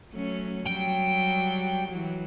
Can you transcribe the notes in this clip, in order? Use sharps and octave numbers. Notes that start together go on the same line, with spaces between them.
F#3 A3 C#4
F#3 G3 G5
E3 F#3